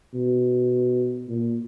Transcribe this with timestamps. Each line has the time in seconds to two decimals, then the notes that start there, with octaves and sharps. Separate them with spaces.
0.14 B2
1.28 A#2